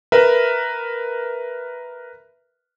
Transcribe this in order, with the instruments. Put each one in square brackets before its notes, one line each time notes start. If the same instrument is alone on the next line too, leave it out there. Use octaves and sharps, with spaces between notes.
[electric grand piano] A#4 B4 E5